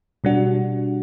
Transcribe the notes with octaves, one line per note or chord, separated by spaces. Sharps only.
B2 G3 D4 F#4